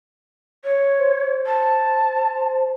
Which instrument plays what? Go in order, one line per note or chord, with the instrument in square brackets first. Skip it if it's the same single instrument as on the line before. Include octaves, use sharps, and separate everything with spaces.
[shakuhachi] C#5
[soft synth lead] C5
[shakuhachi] A5